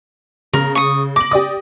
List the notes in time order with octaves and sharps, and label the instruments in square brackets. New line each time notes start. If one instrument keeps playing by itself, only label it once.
[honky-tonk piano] C#3 [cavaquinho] A#4
[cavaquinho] C#6 D#6
[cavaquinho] D6 [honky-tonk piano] A#6 F#7
[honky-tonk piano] G4 D5 D#6